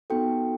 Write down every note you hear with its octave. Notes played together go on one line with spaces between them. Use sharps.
B3 D#4 F#4 A4 G5